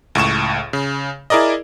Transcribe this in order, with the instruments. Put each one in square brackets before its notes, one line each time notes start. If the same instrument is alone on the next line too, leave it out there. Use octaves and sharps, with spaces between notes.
[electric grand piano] C#2 A2 C#6 E7
C#3
E4 G#4 A#4 D5 D#5